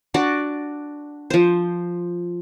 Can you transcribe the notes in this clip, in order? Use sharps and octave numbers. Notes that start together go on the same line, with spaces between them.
D4 F#4 D5
F3 C5